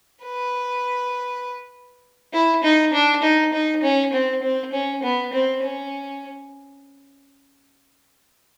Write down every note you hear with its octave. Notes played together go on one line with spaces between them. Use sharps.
B4
E4
D#4
D4
D#4
D#4
C#4
C4
C4
C#4
B3
C4
C#4